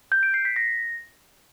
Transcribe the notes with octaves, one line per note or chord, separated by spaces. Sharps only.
G6
D7
C7
B6
A#6